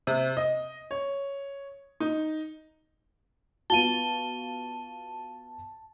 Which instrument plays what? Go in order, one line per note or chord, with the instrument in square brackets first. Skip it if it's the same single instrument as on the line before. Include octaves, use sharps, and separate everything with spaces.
[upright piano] C3
D#5
C#5
D#4
[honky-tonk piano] B3 F4 F#4 [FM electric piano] A5 [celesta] D#7 G7